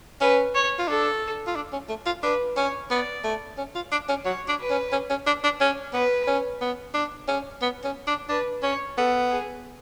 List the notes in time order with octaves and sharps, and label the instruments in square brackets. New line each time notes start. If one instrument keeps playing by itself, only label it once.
[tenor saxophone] C#4 [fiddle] B4
[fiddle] C#5
[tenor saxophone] F4
[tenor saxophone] D4 [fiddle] A4
[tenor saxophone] F4
D4
C#4
A3
F4
[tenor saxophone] D4 [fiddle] B4
[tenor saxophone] C#4 [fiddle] C#5
[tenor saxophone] B3 [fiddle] D5
[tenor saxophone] A3
C#4
F4
D4
C#4
[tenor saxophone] F#3 [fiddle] C#5
[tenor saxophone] D4
[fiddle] B4
[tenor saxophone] C#4
C#4
C#4
D4
D4
C#4
[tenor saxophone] B3 [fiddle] B4
[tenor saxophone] C#4
B3
D4
C#4
B3
C#4
D4
[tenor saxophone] D4 [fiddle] B4
[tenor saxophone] C#4 [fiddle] C#5
[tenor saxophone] B3 [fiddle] A4
[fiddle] G#4